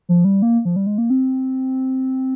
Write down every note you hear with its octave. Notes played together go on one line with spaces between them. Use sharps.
F3
G3
A#3
F3
G3
G#3
A#3
C4